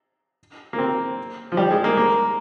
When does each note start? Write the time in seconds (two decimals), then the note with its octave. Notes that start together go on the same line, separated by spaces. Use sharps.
0.73 A#3
0.78 C4
1.52 F3
1.57 G3
1.71 G#3
1.84 A#3
1.97 A#3